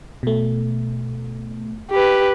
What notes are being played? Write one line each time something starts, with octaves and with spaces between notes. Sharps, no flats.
B2 A3
G4 B4